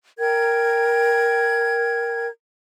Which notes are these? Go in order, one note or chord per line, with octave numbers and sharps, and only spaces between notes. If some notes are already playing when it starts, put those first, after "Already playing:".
A#4 G5 G#6